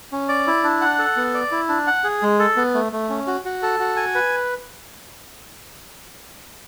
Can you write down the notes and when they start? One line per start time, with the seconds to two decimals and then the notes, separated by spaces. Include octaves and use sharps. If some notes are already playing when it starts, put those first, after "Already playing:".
0.12 C#4
0.29 D5
0.47 E4
0.64 D4
0.81 F#5
0.99 A4
1.17 B3
1.34 D5
1.52 E4
1.69 D4
1.87 F#5
2.04 G#4
2.22 G#3
2.39 A4
2.56 B3
2.74 A3
2.92 A3
3.09 C#4
3.27 F#4
3.45 F#4
3.63 A4
3.80 F#4
3.96 G#5
4.15 B4